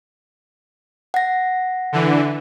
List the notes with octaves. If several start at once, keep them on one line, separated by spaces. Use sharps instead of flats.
F#5 A#6
D3 E3